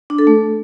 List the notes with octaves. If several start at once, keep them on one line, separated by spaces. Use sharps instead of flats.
D4
A4
A3